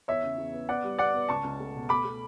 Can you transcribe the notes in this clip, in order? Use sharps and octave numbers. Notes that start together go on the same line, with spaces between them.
E2 C#5 E5
C#3
E2
B3
B3 D5 F#5
G3
B3 D5 F#5
B3
C#2 A5 C#6
C#2
A3
B2
A3 B5 D6
A3